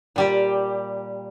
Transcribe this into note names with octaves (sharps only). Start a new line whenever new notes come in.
A#2 G3 G4